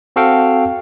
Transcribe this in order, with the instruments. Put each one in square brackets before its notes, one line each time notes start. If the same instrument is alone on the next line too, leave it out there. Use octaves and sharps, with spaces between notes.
[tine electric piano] C4 F#4 A4 F5 G5